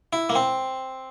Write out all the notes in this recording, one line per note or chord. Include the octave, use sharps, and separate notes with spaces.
E4
A#3
C4